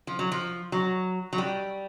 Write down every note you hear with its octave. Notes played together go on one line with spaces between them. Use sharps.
F3
F#3
F3
F#3
F#3
G3